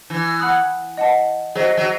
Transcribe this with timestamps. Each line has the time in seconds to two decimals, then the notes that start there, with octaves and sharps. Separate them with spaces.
0.10 E3
0.39 F#5 B5 D#6 F#6
0.98 D#5 F#5 A5
1.55 F#3 G#4 C5 D#5
1.77 F#3